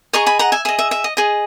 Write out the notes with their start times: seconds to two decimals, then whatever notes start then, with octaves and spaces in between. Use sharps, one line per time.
0.13 G#4 D#5 A#5 C#6
0.26 G#5 B5
0.39 F#5 A#5
0.52 E5 G#5
0.65 G#4 D#5 E5
0.79 E5
0.91 E5
1.04 D#5
1.17 G#4 D#5